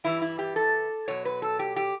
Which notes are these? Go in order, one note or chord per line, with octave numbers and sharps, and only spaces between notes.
G2 E3 G3 E4
E4
G4
A4
B2 F#3 C#5
B4
A4
G4
G4